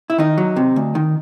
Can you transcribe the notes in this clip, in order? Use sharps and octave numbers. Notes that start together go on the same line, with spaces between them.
E4
D#3 D#4
F#3
C3
D2
D#3